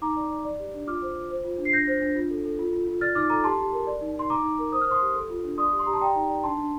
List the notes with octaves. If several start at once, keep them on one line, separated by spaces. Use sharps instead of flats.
D#4 A#5 D6
D5
D5
D5
G4
D4
F4 D6 F6
C5
F4
C5
F4
D4
C7
D4 G6 A#6
C5
D4
F4
A4
A4
F4
F4
F4
D5 F6 A6
D#4 D6 F6
A4 A#5 D6
G4 A5 C6
G4
A#4
D5
D#4
D#4 C6
D#4 A#5 D6
D#4
A#4
C5 D#6
F6
C5 C6 D#6
G4
A4
F4
D4
D5 C6 D#6
G4
C6
G4 A#5
A5 C6
D5 G5 A#5
D#4
D5
D4 A5 C6
D4